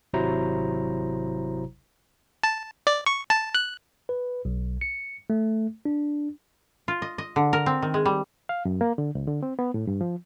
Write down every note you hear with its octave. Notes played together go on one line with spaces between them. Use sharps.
G#1 C3 F#3 E4 C5 A#5
A5
D5
C#6
A5
F#6
B4
B1
C#7
A3
D4
F4
D#5
D#5
D3
A#4
C4
D#3
G#3
G3
F5
F#2
A#3
D3
C#2
D3
C4
B3
A2
G2
F3